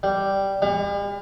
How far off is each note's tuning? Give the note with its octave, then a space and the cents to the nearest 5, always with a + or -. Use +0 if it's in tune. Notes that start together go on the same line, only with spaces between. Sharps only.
G3 -5
G3 +45